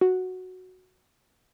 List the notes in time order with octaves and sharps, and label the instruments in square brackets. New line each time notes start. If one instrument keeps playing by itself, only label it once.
[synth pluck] F#4